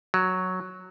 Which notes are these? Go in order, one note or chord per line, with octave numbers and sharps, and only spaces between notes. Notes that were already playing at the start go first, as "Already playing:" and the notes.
F#3